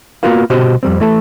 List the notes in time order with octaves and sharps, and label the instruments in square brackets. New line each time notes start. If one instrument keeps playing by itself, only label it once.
[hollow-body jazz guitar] A#3 B3 F4 F#4 A#4 F5
C2 B2 F#4 G4 C5 D#5
F2 G3 C4
E3 A3 A4